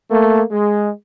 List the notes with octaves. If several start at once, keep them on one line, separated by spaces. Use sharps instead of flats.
A3 A#3
G#3